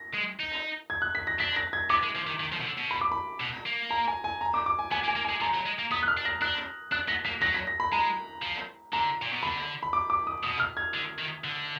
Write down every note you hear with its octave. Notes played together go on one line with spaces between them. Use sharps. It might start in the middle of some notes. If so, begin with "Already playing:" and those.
Already playing: A#6
G#3
D#4
G#6
F#6
B6
A#6
D4 B6
A#6
G#6
B3 D6
G#3
F3
D#3
D#3
F3
B2
D3
B2
B5
D6
B5
B2
A#3
A#5
G#5
G#5
A#5
D6
D6
G#5
B3 G#5
A#3
G#5
A#3
G#5
G#3
F3 A#5
F#3
G#3
A#3
B3 D#6
F#6
F6
D4
A#6
D4 F#6
D4 F#6
B3 A#6
A#3 B6
F#3 A#6
B6
A#6
B5
G#3 A#5
F3
D3 A#5
A#2
B2
D3 B5
B5
D6
D6
D#6
B2 D#6
F6
G#6
D3
D#3
D3